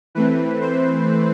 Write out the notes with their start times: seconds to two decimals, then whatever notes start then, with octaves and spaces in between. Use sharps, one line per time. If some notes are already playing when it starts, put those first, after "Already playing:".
0.15 E3 A3 C4 B4
0.61 C5